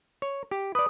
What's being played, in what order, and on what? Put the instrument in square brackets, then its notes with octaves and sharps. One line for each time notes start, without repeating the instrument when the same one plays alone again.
[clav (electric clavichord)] C#5
G4
[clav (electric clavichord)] B4 D5 [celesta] D#6